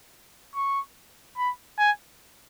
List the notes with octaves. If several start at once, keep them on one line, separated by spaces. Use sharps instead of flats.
C#6
B5
G#5